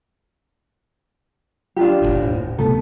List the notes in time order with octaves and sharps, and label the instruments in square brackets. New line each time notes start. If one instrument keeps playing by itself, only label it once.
[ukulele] D4 F4 G4
[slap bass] D#1 G#1 A2
[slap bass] C3 A3 B3 [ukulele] A4